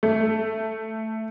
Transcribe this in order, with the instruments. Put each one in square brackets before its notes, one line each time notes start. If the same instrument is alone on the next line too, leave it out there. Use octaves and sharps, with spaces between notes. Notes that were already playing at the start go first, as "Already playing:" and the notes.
[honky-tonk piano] A3